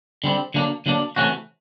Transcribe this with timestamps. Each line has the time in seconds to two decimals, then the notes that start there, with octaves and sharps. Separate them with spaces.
0.24 D3 G3 C4
0.54 D3 F#3 A#3 D4
0.86 D3 F#3 A#3 D4
1.16 C3 E3 A3 C#4 F#4